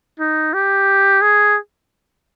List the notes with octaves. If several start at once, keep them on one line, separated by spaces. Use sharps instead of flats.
D#4
G4
G#4